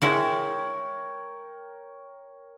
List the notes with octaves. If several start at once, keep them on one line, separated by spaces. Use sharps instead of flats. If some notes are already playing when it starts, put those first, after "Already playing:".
G#3 E4 A#4 C#5 F#5 G5